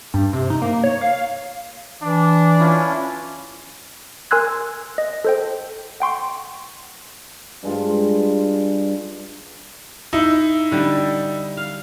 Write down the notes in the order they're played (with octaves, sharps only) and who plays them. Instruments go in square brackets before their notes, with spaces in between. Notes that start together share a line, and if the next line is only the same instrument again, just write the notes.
[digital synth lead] G2
C3
D#4
A#3
C#5
F5
[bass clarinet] E3 [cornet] D4
[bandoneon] C#4 E4 F4
[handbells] A#4 G#5 C6 E6 F#6 G#6
D#5
A4 C5 G5
F#5 G5 C6 C#6
[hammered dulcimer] G2 G#3 F4
[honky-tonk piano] D#4 E4
[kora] D3 G3
F5